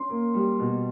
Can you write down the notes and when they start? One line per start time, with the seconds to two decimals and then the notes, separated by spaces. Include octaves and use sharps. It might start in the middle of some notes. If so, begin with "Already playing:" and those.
Already playing: C#4 C6
0.09 A#3
0.34 G3
0.59 B2